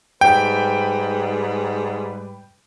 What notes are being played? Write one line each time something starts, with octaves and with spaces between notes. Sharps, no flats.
G#2 G3 B4 G5